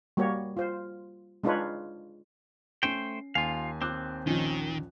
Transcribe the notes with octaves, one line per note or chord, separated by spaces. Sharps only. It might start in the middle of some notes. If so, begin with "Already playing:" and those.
G3 A#3 F#4 G4 C#5
F4 C5
G#3 D4 D#4 F4 B4 C#5
A3 C#4 C5 G5 C7
D#2 F4 F5 G#5
C4 D6 F#6
A#1 D#3 C#4